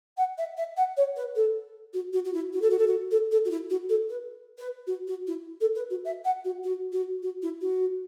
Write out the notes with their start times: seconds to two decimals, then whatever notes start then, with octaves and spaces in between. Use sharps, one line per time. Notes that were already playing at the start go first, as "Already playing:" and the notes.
0.17 F#5
0.38 E5
0.57 E5
0.77 F#5
0.96 C#5
1.16 B4
1.35 A4
1.93 F#4
2.13 F#4
2.24 F#4
2.33 E4
2.53 F#4
2.61 A4
2.70 F#4
2.78 A4
2.87 F#4
3.11 A4
3.31 A4
3.45 F#4
3.50 E4
3.70 F#4
3.89 A4
4.09 B4
4.58 B4
4.87 F#4
5.07 F#4
5.27 E4
5.60 A4
5.75 B4
5.90 F#4
6.05 E5
6.24 F#5
6.44 F#4
6.63 F#4
6.92 F#4
7.22 F#4
7.42 E4
7.61 F#4